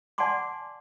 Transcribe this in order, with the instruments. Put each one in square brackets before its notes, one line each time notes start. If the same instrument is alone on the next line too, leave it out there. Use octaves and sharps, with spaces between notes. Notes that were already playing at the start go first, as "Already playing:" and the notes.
[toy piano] D5 F#5 G#5 A5 C6 D6